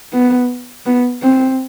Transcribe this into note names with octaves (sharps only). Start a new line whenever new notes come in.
B3
B3
C4